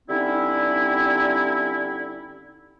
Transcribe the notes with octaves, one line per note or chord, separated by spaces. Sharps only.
D3 G3 C4 C#4 D#4 E4